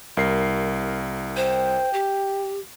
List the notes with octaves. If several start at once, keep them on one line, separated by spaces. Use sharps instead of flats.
C2 A#4 C7
C5 G5
G4